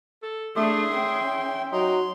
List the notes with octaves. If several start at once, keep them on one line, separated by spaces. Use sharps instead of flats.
A4
A3 D4 G#4 E5 C6
C#4 G5
F#3 D#4 C6